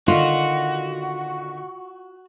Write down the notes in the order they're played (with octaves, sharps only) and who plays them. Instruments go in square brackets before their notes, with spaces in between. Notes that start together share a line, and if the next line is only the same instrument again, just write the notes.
[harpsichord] A#2 D3 D#3 [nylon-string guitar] F4 [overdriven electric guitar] F#4